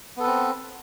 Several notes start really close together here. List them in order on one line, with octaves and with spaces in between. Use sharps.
B3 A4 B4 C4